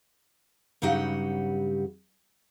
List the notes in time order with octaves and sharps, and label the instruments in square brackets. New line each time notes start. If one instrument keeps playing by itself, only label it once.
[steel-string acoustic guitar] G2 C#3 F#3 D#4 G4 F#5